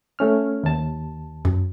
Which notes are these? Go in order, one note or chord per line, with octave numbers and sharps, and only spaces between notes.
A3 C#4 F6
D#2 A5
F#2